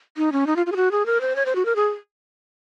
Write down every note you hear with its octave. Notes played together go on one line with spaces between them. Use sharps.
D#4
C#4
D#4
F4
F4
G#4
F#4
G#4
A#4
C5
C#5
C5
F#4
A#4
G#4